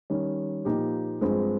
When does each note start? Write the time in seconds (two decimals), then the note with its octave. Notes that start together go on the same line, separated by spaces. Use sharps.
0.10 D#3 G3 C#4
0.65 A#2 F3 A#3 D#4 G4
1.21 G2 F3 G#3 C4